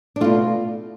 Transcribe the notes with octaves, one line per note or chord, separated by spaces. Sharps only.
D4
B2 A3 F4